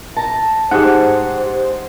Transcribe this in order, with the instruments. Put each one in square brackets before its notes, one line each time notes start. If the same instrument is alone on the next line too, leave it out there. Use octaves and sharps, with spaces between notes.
[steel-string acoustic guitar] A5 A#5
[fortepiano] G#2 G#4 [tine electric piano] G4 F#5 [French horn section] C5